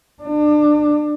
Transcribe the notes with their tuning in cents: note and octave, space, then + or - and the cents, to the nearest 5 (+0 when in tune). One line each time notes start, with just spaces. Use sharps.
D4 +30